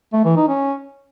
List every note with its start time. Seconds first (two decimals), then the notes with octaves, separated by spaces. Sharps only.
0.13 A3
0.25 E3
0.36 D#4
0.48 C#4